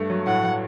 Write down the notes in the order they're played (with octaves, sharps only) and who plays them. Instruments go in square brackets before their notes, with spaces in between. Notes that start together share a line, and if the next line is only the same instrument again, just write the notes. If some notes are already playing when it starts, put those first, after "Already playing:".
Already playing: [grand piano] G2 A3
F#3
[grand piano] A2 [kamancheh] F#5
[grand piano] F#3